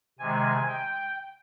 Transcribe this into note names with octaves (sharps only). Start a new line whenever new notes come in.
C3 D#3 G#3 G#5
G5